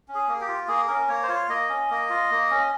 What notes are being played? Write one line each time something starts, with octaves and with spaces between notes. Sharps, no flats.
C#4
G#4
A#3
G4
F4
A#3 G#4
C#4 A#4
A#3 C#5
C5
F4 C#5
A#3 D#5
C#4
A#3
F4
A#3
C#4